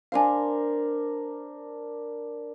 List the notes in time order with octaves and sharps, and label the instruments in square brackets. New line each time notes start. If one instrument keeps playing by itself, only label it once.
[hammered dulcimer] D4 A#4 C5 [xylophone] F5 G#5